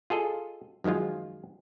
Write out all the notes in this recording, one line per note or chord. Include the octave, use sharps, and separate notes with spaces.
F4 G#4 A4 D#5
F#2 D#3 F3 G#3 F4